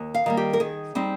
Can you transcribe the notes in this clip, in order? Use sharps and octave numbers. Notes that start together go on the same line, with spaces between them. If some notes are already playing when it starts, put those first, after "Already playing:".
Already playing: D#2
F5
D#3 G3 A#3
G4
A#4
D#3 G#4
G3 C4 D#4